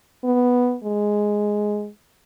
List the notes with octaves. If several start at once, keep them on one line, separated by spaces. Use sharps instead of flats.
B3
G#3